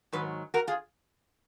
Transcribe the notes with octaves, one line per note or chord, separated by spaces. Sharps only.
G#2 D#3 F#3 B4
F#4 A#4
F4 G#4